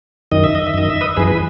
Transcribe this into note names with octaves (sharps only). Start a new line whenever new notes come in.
F#2 D#3 D#5
E5
D#5
E5
F#2 D#3 D#5
E5
B4 D#5
F#2 E3 G#4 B4
B4